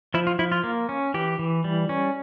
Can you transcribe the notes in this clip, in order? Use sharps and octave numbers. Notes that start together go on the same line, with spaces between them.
F3 E4
F4
F3 E4
F4
A#3
C#4
E3 G4
E3
G3
C#4